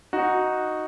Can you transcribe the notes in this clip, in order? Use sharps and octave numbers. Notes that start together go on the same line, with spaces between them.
D#4 F#4